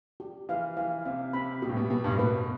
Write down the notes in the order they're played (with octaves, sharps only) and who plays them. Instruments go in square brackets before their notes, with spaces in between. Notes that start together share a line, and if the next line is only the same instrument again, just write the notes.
[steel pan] G4
[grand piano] E3 [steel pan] F5
[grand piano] E3 [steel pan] F5
[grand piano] C3 [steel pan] F5
[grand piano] C3 [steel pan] B5
[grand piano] B2 [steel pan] G4
[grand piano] A2
B2
[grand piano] B2 [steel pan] G4
[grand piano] G2
A2
[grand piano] B2 [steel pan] B4